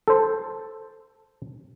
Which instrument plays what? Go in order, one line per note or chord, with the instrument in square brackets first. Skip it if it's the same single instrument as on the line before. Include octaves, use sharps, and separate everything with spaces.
[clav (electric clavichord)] A4 C5